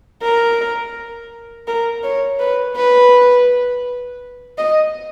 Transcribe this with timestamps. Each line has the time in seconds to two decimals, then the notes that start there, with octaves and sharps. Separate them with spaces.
0.22 A#4
1.68 A#4
2.03 C#5
2.39 B4
2.76 B4
4.58 D#5